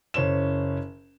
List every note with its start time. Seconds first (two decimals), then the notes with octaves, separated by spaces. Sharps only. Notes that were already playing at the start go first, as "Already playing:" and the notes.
0.14 F#1 C#4 C5 E7